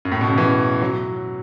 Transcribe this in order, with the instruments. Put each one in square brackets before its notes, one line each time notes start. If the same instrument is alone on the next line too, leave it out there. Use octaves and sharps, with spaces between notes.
[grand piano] F#2
A2
B2
C#3
E3
F#3